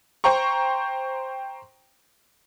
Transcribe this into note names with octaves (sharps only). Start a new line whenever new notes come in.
C5 G5 A#5 C#6